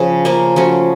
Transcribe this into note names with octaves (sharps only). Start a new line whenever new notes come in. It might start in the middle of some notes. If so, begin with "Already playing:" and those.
Already playing: C#3 F3
C#3 F3 A#3
F3 A3 C#4 F#4